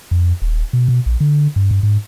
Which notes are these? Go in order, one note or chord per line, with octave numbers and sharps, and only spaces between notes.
F2
D#1
B2
B2
A#1
D3
G2
G2
G#2